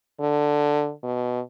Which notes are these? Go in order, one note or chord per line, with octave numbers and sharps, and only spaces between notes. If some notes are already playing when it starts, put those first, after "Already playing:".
D3
B2